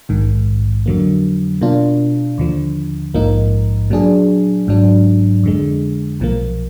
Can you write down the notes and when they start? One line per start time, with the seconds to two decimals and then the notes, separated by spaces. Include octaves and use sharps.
0.09 A#1 G#2 D#3
0.86 F2 D3 F#3 A#3
1.61 B2 A#3 D4 F4
2.38 D#2 D3 F3
3.14 A#1 G#2 F3 A#3 D#4
3.90 A#2 F#3 D4 G#4
4.67 G#1 G#2 F#3 D4
5.43 F2 D3 G#3
6.20 B1 A#2 F3 A#3